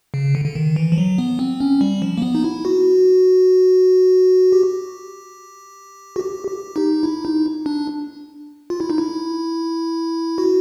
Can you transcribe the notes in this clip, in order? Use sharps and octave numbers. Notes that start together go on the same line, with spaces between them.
C#3
D3
D3
D#3
E3
F3
F#3
B3
C4
C#4
G3
F3
A#3
B3
D#4
E4
F#4
G4
F#4
G4
G4
D#4
E4
D#4
D4
F4
E4
D#4
E4
F#4